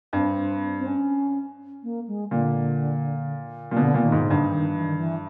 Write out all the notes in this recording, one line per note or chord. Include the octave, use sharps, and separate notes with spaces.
G2 C4
C4
C#4
A#3
G#3
A#2 D3
A#2
B2 D3
A#2
D#3
G#2
D3
G2
D#3
E3
D#3
E3